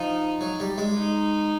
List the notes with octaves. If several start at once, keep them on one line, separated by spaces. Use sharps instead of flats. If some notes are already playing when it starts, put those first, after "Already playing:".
Already playing: F3 D#4
F#3
G3
G#3
D#4